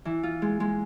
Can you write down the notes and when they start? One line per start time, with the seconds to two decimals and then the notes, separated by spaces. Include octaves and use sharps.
0.05 E3
0.23 F4
0.42 G#3
0.60 G#3